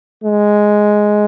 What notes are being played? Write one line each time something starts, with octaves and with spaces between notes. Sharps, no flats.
G#3